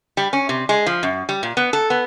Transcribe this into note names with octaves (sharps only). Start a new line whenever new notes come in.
G3
C#4
C3
G#3
F3
F#2
G3
A#2
B3
A4
B3